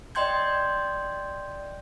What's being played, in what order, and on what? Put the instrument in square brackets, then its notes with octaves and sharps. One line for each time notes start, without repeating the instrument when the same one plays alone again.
[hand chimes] D5 D#5 G5 C6 G6 G#6